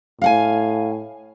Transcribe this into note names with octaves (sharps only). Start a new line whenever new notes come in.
A2 F5 F#5 G#5